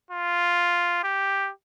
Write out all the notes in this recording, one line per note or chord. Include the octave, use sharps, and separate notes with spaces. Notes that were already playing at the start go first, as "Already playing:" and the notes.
F4
G4